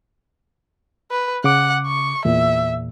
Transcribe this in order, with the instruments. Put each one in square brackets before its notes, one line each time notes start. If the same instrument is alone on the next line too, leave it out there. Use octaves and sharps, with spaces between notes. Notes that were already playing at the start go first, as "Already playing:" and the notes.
[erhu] B4
[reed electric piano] C#3 D6 [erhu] F#5
[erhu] C#6
[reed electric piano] E2 A#2 [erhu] E5